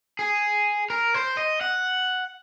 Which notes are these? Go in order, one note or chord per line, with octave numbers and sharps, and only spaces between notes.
G#4
A#4
C5
D#5
F#5